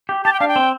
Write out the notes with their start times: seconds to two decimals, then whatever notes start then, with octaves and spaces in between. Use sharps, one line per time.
0.09 G4
0.25 G4 A5
0.33 G5
0.40 D4 F5
0.48 G5
0.56 C4